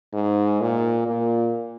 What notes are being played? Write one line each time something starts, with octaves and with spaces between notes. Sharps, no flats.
G#2
A#2
A#2